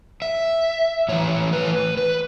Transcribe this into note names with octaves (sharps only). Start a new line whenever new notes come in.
E5
A2 E3 C#5
B4
B4